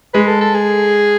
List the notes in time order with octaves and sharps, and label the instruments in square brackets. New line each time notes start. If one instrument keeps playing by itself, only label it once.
[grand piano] G#3 [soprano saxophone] B4
[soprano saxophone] A4
A4
G#4